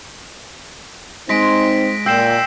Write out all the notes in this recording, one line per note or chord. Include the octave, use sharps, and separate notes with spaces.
G#3 C4 D#4 A#6 B6 D7
A#2 G5 E6 C7 E7